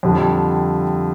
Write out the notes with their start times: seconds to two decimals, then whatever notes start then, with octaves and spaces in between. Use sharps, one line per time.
0.03 F2 D3 G3